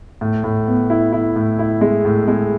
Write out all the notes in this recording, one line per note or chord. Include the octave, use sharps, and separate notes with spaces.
A2
A2
B3
E4
E4
A2
E4
G#3
A2
G#3